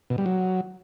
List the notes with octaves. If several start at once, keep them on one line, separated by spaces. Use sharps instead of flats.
B2
G3
F#3